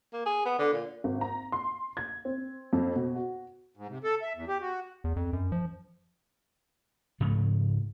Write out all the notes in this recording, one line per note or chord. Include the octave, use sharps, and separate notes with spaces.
A#3
G#4
B3
D3
A#2
G#1
A#5
C6
G#6
C4
F2
B2
F#4
G#2
C3
A4
E5
E2
G4
F#4
E2
F2
F#2
F3
G#2 C#3 F3 A3